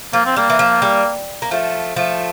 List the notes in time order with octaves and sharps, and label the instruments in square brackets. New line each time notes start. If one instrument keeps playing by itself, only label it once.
[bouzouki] F3 [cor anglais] A#3
[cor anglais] C4
[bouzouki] G3 [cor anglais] A#3
[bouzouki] E3
F3
G3
A#3
F3 A3
F3 A3